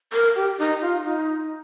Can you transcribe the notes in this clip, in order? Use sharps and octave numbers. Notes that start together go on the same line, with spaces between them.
A#4
G4
D#4
F4
D#4